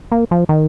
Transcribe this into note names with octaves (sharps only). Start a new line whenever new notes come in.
A#3
F3
D#3